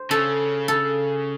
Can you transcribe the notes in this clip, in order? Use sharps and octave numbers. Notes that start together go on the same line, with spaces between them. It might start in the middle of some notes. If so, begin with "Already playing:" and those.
Already playing: C5
C#3 A4
A4